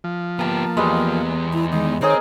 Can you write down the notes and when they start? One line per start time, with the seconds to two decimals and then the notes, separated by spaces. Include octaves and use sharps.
0.04 F3
0.39 A#3 B3 G4 A5 A#5
0.77 E2 G3 G#3 B3
1.53 E4
1.73 D#3 G#3
2.02 D#3 C4 G#4 A#4 C#5 D#5